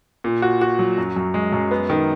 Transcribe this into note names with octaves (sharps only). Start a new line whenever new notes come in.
A#2
F#4
F#4
F#3
F#2
F#2
G#3
F#2
B3
D#3